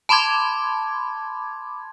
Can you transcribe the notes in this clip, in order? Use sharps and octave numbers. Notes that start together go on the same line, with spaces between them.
A5 B5 C6 D6 G#6